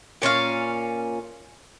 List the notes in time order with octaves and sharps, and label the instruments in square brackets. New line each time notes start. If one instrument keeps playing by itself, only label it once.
[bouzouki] A#2 C#4 G#4 F5